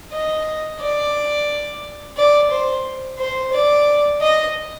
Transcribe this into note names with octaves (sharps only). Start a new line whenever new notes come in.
D#5
D5
D5
C5
C5
D5
D#5